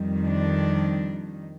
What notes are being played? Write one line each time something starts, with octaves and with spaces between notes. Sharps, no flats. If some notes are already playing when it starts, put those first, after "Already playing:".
Already playing: F2 D#3 G3
D4